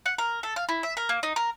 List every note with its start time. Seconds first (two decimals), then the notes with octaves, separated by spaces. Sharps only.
0.06 F#5
0.18 A#4
0.43 A4
0.56 F5
0.69 E4
0.83 E5
0.97 A#4
1.09 A#3
1.23 D#4
1.36 A#4